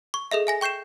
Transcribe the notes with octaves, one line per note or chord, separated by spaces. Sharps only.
C#6
G#4 A4 D#5 E5
E5 G#5 A#6
G5 C#6 G6 C7 E7